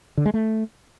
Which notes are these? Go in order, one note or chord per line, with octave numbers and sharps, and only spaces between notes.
D3
G#3
A3